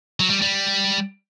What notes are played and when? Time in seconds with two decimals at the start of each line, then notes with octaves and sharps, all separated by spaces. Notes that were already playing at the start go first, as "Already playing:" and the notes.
0.20 F#3
0.30 G3
0.42 G3